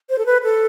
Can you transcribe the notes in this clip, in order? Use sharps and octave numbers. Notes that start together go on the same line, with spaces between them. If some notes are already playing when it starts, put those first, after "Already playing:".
C5
A4
B4
A4